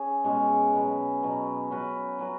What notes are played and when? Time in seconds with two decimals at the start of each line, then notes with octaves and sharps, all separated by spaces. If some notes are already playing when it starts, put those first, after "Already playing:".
Already playing: C#4 G#4
0.24 B2 G#3 C#4 G#4
0.73 B2 F#3 B3
1.22 B2 F#3 B3
1.70 F#3 C#4 F#4 B4
2.19 F#3 C#4 F#4 B4